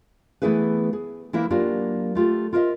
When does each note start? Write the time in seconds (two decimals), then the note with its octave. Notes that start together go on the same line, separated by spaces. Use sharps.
0.42 E3 A3 B3 E4 G#4 B4
0.93 G#4
1.33 E3 A#3 E4 A#4 C5 E5
1.50 F#3 A#3 D4 F4 G4
2.15 A3 F4 G4 A4
2.53 F4 A#4 C5 C#5 D#5 E5